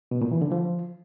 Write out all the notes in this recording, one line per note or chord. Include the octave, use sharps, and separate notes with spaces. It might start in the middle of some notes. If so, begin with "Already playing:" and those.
B2
A#2
E3
D3
F3